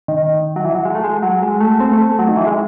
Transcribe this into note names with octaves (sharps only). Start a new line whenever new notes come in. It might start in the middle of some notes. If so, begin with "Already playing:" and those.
D#3
F#3
E3
F#3
G#3
A3
G#3
F#3
G#3
A3
C4
A3
F#3
D#3
E3
G#3